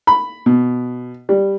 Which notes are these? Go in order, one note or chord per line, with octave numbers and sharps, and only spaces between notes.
B5
B2
G3